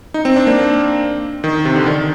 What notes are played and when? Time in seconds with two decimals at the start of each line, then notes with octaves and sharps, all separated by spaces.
0.14 D#4
0.25 C4
0.36 D4
0.47 A#3
1.44 D#3
1.65 C3
1.76 D3
1.86 D#3